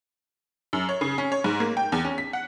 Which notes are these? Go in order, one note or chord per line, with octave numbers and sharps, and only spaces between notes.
F#2
C#5
C#3
C#4
C#5
G#2
A#3
G5
E2
C#4
B6
F#5